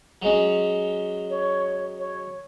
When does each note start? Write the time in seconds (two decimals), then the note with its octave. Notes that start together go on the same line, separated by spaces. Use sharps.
0.22 F#3 G#3 C#4
1.30 C#5
1.99 C#5